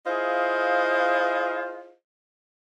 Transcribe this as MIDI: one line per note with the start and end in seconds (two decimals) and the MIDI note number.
0.07 1.91 64
0.07 1.91 65
0.07 1.91 68
0.07 1.91 72
0.07 1.91 75
0.07 1.91 77